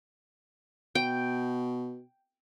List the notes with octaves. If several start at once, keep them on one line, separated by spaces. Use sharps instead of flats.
B2 G5